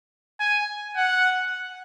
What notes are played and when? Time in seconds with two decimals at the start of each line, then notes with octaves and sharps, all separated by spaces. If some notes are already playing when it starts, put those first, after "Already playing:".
0.40 G#5
0.96 F#5